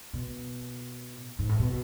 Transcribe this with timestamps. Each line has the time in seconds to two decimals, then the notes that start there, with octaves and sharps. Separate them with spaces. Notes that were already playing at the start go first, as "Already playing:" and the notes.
0.13 B2
1.39 G#2
1.49 A2
1.59 B2